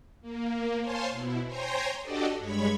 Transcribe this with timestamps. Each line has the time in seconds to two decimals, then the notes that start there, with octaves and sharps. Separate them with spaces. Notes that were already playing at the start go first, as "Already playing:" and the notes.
0.21 A#3
0.79 C5 C#5 F5 G#5 A5 C6
1.10 B2 E4
1.47 C5 C#5 G5 G#5 A#5 C6
2.01 D4 F#4 G4 A4 D5 D#5
2.37 G2 G#3 C#5 B5 C#6